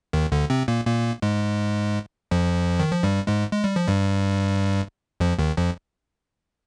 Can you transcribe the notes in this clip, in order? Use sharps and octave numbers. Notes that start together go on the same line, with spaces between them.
D#2 D#3
D2 D3
C3 C4
A#2 A#3
A#2 A#3
G#2 G#3
F2 F3
D#3
F3
G2 G3
G#2 G#3
G#3
G3
F3
G2 G3
F2 F3
D#2 D#3
F2 F3